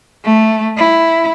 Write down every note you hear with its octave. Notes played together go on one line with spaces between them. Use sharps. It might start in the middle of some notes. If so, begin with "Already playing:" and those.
A3
E4